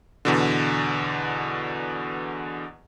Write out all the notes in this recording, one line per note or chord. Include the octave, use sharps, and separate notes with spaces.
E2 B2 D3